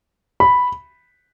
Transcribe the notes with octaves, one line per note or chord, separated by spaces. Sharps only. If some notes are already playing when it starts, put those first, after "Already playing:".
B5